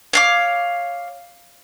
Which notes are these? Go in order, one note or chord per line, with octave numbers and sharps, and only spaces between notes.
C#5 F5 D6